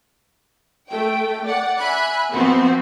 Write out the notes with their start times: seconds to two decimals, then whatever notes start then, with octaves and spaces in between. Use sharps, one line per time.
0.90 A3 G5
1.46 D5 F#5
1.77 E5 G#5 B5 F#6
2.32 F3 B3 C4 F#4 C5